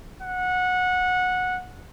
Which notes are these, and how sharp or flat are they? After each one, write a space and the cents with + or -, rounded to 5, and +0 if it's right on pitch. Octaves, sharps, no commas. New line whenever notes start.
F#5 -20